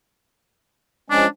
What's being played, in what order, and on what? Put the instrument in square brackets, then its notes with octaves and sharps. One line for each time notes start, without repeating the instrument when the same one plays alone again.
[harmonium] F3 G#3 C#4 [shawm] D4